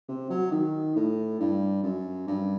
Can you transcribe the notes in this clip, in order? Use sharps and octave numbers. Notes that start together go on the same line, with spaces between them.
C3
F#3
D#3
A2
G2
F#2
G2